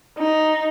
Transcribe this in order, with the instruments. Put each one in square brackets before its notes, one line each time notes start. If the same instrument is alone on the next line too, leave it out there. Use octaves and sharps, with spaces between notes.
[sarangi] D#4